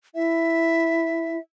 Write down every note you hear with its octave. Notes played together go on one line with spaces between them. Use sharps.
E4 E5